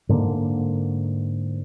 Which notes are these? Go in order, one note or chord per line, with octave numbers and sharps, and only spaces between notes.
G#2 D3 A#3